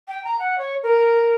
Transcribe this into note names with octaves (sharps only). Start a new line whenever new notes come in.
G5
A#5
F#5
C#5
A#4